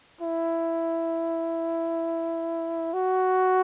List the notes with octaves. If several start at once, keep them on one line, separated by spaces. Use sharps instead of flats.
E4
F#4